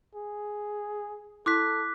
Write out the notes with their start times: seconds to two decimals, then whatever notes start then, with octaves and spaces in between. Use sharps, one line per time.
0.15 G#4
1.46 E4 A4 D6 F#6 B6